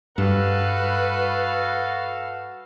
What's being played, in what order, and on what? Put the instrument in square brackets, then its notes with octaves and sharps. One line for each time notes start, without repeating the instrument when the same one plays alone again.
[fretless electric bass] G2 [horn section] F#4 A4 F5 [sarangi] B4